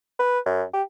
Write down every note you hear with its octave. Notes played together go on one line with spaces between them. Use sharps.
B4
F#2
G4